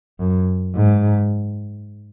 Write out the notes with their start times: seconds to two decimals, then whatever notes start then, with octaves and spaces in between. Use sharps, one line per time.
0.19 F#2
0.75 G#2